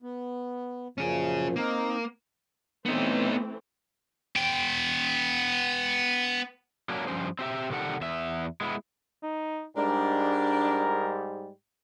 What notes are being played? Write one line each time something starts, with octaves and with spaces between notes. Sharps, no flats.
B3
F#2 A#2 F3 C#4 G#4
A#3 C4 D#4
E3 A3 B3 C4 D#4
B3 G5
F#3 A#3 C#4 D4
G2 F3 C#4 C5
C4 G4 E5
C3 D#3 G3 A4 F#5
E2 E5
G#3 B3 E4
D#4
G#2 G3 G#3 D4 A#4